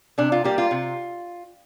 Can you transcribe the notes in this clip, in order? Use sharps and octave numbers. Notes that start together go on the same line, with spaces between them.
C3 D4
F4
G3 A#3 G4
F4
C3